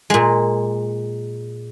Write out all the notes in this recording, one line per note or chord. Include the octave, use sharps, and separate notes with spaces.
A#2 G#3